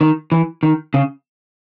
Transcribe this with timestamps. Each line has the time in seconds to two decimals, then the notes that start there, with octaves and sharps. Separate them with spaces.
0.01 D#3
0.32 E3
0.63 D#3
0.94 C#3